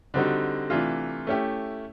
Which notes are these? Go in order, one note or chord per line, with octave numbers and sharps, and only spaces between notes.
D3 G3 C4 D#4 F#4
C3 E3 A3 D4 F4
A3 C#4 E4 G4